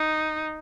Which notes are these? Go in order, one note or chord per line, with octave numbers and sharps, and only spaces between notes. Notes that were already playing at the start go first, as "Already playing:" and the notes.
Already playing: D#4